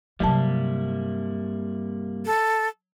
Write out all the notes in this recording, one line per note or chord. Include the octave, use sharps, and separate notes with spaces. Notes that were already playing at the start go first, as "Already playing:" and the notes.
G2 C3 F#3 G3 A#3 E4 A5
A4